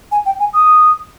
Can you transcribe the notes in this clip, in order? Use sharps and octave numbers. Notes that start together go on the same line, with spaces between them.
G#5
G5
G#5
D#6